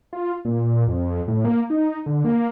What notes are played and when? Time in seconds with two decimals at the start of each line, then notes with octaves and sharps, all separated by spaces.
0.13 F4
0.45 A#2
0.87 F2
1.28 A2
1.45 A#3
1.70 D#4
2.06 D3
2.25 A#3